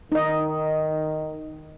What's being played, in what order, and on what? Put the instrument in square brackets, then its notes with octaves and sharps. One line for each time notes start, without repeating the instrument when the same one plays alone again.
[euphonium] D#3 [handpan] D#4 D#5